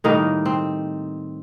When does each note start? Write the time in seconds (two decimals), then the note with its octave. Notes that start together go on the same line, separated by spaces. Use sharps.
0.04 A2 D#3 G3 A#3 D#4
0.45 C4